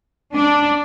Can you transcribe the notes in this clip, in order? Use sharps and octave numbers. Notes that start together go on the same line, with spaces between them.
D4